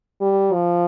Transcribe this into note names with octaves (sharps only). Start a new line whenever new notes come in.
G3
F3